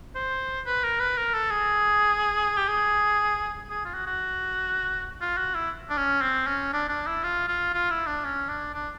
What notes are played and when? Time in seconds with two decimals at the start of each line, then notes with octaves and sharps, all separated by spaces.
0.15 C5
0.66 B4
0.83 A#4
1.00 B4
1.17 A#4
1.34 A4
1.51 G#4
2.57 G4
2.68 G#4
3.70 G#4
3.85 F4
3.94 F#4
4.07 F#4
5.21 F4
5.37 F#4
5.55 E4
5.90 D4
5.97 C#4
6.21 C4
6.47 C#4
6.73 D4
6.89 D4
7.07 E4
7.24 F4
7.48 F4
7.74 F4
7.90 E4
8.07 D4
8.25 C#4
8.49 D4
8.74 D4